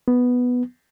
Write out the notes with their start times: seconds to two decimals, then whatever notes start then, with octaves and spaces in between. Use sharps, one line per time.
0.08 B3